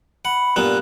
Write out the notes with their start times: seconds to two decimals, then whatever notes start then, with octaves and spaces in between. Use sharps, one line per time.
0.25 F#5 B5
0.56 G2 A#2 B3 F#6